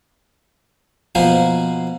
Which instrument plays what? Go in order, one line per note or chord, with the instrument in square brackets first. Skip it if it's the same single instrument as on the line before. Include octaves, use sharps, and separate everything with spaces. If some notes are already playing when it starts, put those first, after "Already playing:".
[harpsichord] B2 F3 A#3 C5 G#5